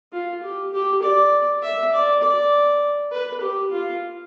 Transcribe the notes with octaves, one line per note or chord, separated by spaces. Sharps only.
F4
G4
G4
D5
E5
D5
D5
B4
G4
F4